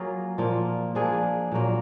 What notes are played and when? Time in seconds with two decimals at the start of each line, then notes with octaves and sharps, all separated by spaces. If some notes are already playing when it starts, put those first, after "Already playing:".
Already playing: F#3 A#3 F4 G#4
0.38 A#2 F3 A#3
0.95 F3 A#3 D4 G#4
1.52 A#2 F#3 A#3